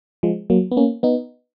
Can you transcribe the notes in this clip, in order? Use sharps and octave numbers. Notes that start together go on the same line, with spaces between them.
F3 G#3
F#3 A#3
B3
A#3 C#4
B3 D#4